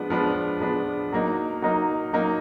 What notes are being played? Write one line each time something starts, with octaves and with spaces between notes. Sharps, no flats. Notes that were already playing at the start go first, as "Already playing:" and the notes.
Already playing: F3 G#3 B3 D4
F3 G#3 B3 D4
F3 G#3 B3 D4
F#3 A#3 D#4
F#3 A#3 D#4
F#3 A#3 D#4